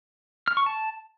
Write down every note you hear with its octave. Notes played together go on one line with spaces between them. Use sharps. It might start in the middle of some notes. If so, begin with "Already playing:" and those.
F6
C#6
A5